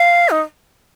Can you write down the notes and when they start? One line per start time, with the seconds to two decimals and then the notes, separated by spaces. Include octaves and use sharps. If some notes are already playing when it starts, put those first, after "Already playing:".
Already playing: F5
0.30 D#4